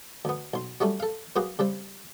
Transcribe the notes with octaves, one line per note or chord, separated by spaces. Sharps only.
D2 B3
B1 C6
F#3 G3 A3 C#4
A4 F5
F#3 A#3 B3 F#4 G#4
C#3 G3 C4